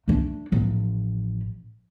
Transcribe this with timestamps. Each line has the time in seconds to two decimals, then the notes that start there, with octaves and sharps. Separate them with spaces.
0.08 A3 D4
0.52 A1 F3